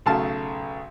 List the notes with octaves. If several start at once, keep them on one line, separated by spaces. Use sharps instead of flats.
B1 C#3 A3 F5 A5